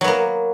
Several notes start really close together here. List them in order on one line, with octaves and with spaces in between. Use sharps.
F#3 B3 A#3